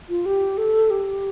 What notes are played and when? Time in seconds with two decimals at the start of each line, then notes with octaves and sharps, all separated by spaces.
0.09 F4
0.26 G4
0.58 A4
0.91 G4